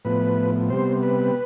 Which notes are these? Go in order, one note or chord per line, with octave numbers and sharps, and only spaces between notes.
A2 F3 B3 B4
C3 G3 B3 C5
B4